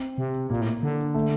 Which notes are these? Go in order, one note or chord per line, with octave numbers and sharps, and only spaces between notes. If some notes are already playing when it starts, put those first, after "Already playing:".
Already playing: C4
C3
A#2 A#3
A2
D3
A3